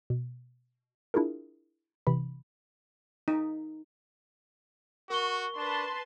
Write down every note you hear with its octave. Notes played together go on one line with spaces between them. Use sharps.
B2
D4 E4 F4 G#4 A#4
C3 E3 B5
D#4
F#4 A#4 C#6 G7
D4 B4 A5 C6